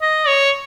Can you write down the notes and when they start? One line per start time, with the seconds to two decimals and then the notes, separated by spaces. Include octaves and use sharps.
0.02 D#5
0.27 C#5